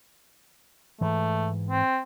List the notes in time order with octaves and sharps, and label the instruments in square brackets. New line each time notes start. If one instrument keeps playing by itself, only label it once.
[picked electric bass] G#2 E3 [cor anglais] A3
[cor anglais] C4